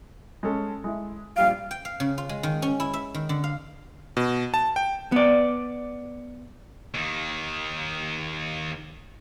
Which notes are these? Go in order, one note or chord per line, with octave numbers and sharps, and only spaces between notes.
G#3 C#4 A4
G#3 E4
A#1 G3 F5 D7
G5
F5
C#3
F4
G#3
D#3
C#4
E4
E5
D#3
D3
F5
B2
A5
G5
B3 D5
D#2 D#3